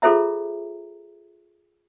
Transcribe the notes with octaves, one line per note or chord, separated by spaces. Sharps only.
F4 G#4 A4 C5 E5 A#5